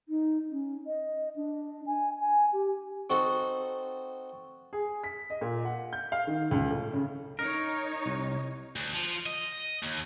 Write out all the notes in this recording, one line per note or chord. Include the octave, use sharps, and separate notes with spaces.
D#4
C#4
D#5
D4
G#5
G#5
G4
C4 D#4 F#4 A4 F#5
G#4
B6
D#5
A#2
F#5
G6
F5
D#3
C#2
A2
C#3
D#4 A#4 C#5
C2
D2
F3
D#5
D#2